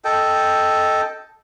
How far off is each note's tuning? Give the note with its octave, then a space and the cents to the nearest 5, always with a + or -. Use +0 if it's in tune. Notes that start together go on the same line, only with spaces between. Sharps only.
A4 +0 D#5 +0 G5 +0